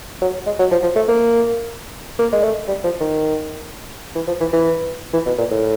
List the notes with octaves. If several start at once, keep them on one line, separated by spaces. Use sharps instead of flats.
F#3
G#3
F#3
F3
F3
A3
A#3
A#3
G#3
A3
G3
F3
D#3
E3
F3
E3
E3
E3
B2
A#2
A2